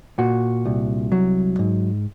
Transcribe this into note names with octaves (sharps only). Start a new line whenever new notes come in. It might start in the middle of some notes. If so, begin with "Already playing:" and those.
A#2 F#4
C2
F#3
G#2